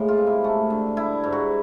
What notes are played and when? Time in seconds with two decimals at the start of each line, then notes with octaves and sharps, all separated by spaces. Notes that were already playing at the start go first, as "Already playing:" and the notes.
Already playing: A2 G#3 A#3
0.08 F4
0.18 C3
0.27 E4
0.44 A3
0.70 D3
0.97 G3 E4
1.24 G#2
1.32 F#4